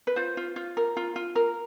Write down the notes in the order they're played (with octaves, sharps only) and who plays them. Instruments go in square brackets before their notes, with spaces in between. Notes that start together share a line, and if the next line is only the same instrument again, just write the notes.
[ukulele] B4
F4 C5
F4
F4
A#4
F4
F4
A#4